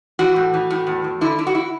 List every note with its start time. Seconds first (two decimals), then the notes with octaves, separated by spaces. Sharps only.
0.19 E3 F#4
0.36 A2
0.54 E3
0.70 A2
0.87 E2
1.04 E2
1.21 D3 E4
1.38 D3 E4
1.47 F#4
1.55 E4